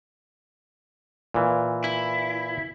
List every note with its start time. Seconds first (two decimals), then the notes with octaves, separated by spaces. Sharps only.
1.34 A#2 E3
1.84 E4